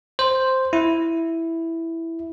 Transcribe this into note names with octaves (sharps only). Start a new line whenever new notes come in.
C5
E4